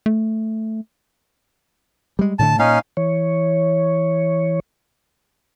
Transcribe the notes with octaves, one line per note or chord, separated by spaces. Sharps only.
A3
G3 G#3
A2 D3 A3 A5
A#2 C#4 D#4 F5
E3 C#5